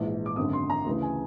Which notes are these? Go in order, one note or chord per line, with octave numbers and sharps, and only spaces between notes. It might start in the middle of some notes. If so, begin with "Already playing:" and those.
Already playing: A#1 G#2 E3
D6
G#1 F#2 D3 D#6
C6
A#5
D2 C#3 E3
G#5